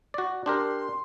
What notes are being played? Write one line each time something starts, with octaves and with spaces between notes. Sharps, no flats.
F#4 D5
D4 G4 A#4 C6